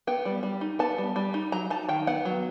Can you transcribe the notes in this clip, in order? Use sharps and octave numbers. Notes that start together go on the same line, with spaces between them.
B3 G5
G3
G3
D#4
B3 A5
G3
G3
D#4
F#3 A#5
D#4 A5
D#3 G5
B3 F#5
F#3